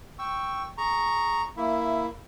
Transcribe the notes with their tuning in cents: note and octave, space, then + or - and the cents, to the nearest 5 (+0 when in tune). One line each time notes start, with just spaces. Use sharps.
G5 +0 C#6 +0 E6 +5
G#4 +0 A#5 +0 C#6 +0
A#3 +0 E4 +0 E5 +10